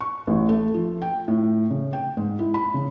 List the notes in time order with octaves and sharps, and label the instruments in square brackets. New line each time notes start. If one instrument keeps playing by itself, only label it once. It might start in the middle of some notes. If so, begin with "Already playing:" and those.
[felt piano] C#6
A1
A3
F3
G5
A2
C#3
G5
G#2
E4
B5
C#3